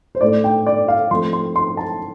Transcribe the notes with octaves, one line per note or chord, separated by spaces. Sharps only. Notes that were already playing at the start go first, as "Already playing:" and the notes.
C5
A2 A3 D4 D5
G5
D5
F5
F3 A3 C4 C6
C6
C6
A5